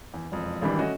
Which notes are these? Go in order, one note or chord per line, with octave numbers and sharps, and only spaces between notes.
E2
E1 F2
G#1 D#3 E3 G3 D4 B5
A3 C#4 F#4 D#5